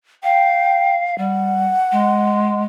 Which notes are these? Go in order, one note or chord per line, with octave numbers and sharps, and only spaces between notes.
F5 G5
G3 F#5
G#3